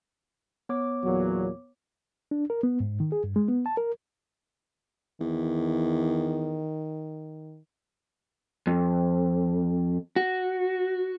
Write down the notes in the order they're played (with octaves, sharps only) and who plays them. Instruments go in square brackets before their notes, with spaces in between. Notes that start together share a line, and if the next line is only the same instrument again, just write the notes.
[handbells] B3 C#5 D6
[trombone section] E2 A#2 F#3
[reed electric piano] D4
A#4
B3
G#2
D#3
G#4
G2
G#3
B3
A5
A#4
[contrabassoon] E2 [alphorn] D#3
[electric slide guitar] F2
F#4